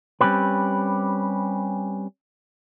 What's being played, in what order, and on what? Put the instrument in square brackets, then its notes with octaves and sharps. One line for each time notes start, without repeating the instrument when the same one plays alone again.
[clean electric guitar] G3 C4 C#4 G4 B4